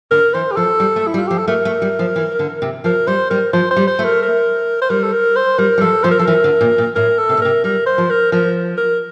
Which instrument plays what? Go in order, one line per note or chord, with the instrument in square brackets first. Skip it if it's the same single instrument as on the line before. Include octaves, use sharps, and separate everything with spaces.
[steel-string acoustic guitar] D3 [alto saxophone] A#4
[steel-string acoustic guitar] E3 [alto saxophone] C5
[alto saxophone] G4
[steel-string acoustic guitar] F3 [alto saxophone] A4
[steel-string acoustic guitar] G3
A3
[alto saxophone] E4
[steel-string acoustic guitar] G3
[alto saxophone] F4
[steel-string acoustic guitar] F3 [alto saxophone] G4
[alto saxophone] A4
[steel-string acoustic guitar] A3 [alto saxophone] A#4
[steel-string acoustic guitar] A3
G3
F3
E3
D3
C3
[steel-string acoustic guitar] F3 [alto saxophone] A#4
[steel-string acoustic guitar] G3 [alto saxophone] C5
[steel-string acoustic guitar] G3 [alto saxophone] A#4
[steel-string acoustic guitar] F3 [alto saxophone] C5
[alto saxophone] C5
[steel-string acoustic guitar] G3
[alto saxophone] C5
[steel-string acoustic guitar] A3
[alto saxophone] A#4
A#4
C5
[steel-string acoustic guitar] G3 [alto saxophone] A#4
[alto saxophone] A4
A#4
C5
[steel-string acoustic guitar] G3 [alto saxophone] A#4
[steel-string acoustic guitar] G3
[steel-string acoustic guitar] F3 [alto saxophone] A4
[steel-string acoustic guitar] F3 [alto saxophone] C5
[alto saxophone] A#4
[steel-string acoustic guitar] F3 [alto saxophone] A4
[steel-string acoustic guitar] E3 [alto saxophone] A#4
[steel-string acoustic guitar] D3
A#2
A#2
[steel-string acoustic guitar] A2 [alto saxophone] A#4
[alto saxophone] A4
[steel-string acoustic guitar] C3
A#2
[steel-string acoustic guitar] C3 [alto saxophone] A#4
[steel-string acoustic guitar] G3 [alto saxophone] A#4
[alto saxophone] C5
[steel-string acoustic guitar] F3
[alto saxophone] A#4
[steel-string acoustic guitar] F3 [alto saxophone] A#4
[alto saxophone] A#4